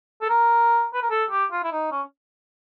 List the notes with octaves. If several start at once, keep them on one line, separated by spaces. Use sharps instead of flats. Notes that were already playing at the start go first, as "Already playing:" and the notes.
A4
A#4
B4
A#4
A4
G4
F4
E4
D#4
C#4